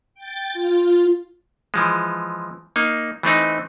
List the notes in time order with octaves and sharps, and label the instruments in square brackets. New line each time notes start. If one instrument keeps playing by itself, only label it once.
[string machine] G5 A6
F4
[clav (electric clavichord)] E3 F3 G#3
A#3 D#4
E3 A3 C4 D#4